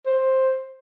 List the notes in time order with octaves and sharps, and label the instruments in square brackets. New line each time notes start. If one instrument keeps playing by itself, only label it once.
[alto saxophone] C5